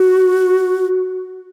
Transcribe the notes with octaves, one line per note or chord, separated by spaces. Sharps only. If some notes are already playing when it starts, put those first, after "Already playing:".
Already playing: F#4